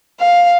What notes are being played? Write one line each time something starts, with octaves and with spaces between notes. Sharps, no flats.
F5